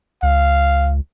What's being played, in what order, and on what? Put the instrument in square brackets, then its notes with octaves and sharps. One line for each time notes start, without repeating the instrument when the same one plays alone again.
[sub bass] C#2 [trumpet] F5